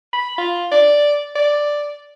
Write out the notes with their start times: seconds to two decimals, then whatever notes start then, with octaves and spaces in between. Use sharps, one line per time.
0.13 B5
0.38 F4
0.72 D5
1.35 D5